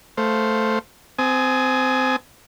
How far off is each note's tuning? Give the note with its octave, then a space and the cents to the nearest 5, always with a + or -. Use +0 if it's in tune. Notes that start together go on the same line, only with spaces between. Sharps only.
A3 +0 C5 +0 F5 +10
C4 -20 G#5 +25 D#6 +0